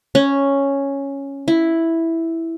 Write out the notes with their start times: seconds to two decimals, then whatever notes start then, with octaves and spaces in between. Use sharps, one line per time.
0.15 C#4
1.48 E4